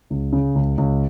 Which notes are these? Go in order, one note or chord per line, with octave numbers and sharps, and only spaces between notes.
C#2
C#3
C#2
C#2